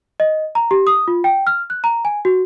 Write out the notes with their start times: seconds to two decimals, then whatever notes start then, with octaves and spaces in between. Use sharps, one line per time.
0.20 D#5
0.55 A#5
0.71 G4
0.87 D#6
1.08 F4
1.24 G5
1.47 F6
1.70 F#6
1.84 A#5
2.05 G#5
2.25 F#4